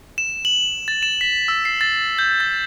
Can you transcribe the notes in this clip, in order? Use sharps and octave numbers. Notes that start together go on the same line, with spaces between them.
E7
F#7
A6
E7
B6
E6
C7
A6
G6
A6